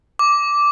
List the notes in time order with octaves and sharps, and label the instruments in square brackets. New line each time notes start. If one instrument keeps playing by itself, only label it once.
[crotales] D6